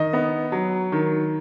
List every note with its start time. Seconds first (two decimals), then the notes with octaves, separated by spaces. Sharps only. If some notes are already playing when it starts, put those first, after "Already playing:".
Already playing: D#3 D#5
0.13 B3
0.52 F#3
0.92 D#3